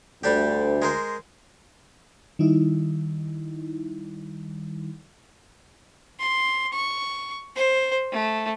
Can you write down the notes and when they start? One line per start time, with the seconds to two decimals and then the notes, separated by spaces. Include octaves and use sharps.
0.23 D2 G3 D4 G4
0.82 G#3 A#4 C5
2.39 D#3 G3 D#4 E4
6.19 C6
6.73 C#6
7.56 C5
8.12 A3